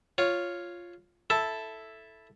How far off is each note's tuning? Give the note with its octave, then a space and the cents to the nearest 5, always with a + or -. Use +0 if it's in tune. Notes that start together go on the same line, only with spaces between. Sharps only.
F4 +0 C#5 +0
E4 +0 A4 +0 A5 +0